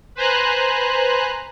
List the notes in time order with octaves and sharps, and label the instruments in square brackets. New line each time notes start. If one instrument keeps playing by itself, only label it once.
[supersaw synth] B4 C5 G#5 A#5 F#6